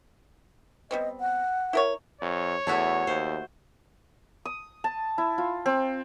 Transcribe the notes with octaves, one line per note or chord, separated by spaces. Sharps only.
G3 B3 C4 D#5
F#5
E4 A#4 C#5
F2 C#5
E2 A3 E4 F#4
D#2 C5
D#6
A5
E4
F4
C4